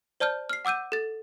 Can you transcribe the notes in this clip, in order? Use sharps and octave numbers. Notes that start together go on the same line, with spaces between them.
C5 D5 A5 F6 G6
F6 C7
F#5 D6 E6 G6 D#7
A4 A6